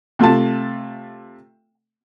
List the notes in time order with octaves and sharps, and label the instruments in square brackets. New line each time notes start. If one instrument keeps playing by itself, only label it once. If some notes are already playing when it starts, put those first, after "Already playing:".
[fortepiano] C3 A3 F4 A5